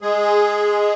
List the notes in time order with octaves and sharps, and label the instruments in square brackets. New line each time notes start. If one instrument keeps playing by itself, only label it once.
[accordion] G#3 G#4